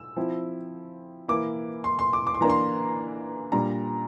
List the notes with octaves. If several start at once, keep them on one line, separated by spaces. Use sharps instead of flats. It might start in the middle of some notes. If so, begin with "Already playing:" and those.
Already playing: E6
F3 C4 E4
E3 A#3 E4 D6
C6
C6
D6
D6
C6
E3 A#3 D4 A#5
C6
A#2 G3 D4 A#5